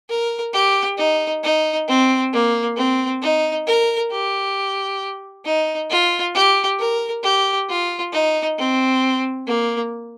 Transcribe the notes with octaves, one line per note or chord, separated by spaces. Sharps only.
A#4
G4
D#4
D#4
C4
A#3
C4
D#4
A#4
G4
D#4
F4
G4
A#4
G4
F4
D#4
C4
A#3